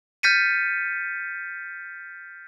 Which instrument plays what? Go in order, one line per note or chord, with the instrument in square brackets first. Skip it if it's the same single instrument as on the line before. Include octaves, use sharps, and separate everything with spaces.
[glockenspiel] F6 G6 A6 B6 C#7 D#7